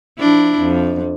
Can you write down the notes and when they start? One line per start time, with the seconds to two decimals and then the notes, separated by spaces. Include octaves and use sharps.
0.18 F3 D4 E4
0.59 F2